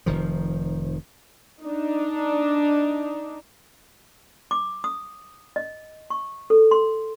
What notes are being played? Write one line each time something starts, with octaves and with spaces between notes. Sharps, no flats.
F1 D#3 F3
D4 D#4
D6
D#6
D#5
C#6
A4
C6